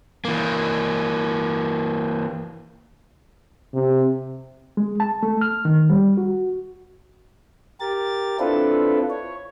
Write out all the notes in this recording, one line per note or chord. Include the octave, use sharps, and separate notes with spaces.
E3 A#3
C3
G#3
A5
A3
F6
D#3
G3
F#4
G4 A#4 A6
C4 D4 E4 F4 A4 B4
C#5